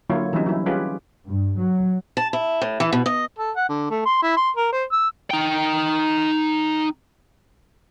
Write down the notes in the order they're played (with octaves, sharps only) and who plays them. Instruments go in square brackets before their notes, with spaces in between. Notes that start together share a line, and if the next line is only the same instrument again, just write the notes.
[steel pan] D3 F#3 A#3 E4 F4 C#5
E3 F#3 G3 C4 C#4 D#4
F#3 E4
G3 C#4 F4 G4 G#4 B4
[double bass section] G2
F#3
[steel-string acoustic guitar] A5
E4
A2
E3
B2
D#5
[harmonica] A4
F#5
D3
A3
C6
E4
C6
A#4
C5
E6
[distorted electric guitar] D#4 G5